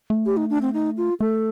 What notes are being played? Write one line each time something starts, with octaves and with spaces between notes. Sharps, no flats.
A3
G4
D#4
D4
C4
D#4
F4
A3 A4